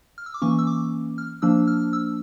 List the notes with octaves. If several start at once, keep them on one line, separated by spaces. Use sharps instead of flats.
F6
E6
D6
E3 A#3 C#4 C#6
E6
D6
F6
F3 A#3 D4 E6
F6
E6